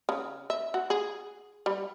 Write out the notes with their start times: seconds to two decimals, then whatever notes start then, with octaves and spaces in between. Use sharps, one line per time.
0.09 C#3
0.50 E5
0.74 F#4
0.90 G#4
1.66 G3